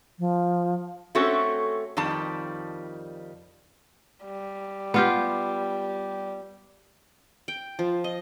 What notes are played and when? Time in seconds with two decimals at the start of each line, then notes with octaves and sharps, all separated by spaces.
0.19 F3
1.15 A3 C4 C#4 F#4 A4
1.97 F2 D#3 G3 A5
4.25 G3
4.94 B3 F4 G4
7.48 G5
7.79 F3
8.04 D#5